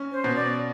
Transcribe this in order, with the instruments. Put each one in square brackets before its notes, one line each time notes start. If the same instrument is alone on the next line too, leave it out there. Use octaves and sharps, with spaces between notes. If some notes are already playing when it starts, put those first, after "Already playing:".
Already playing: [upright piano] C#4
[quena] C5
[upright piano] B2
[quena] D5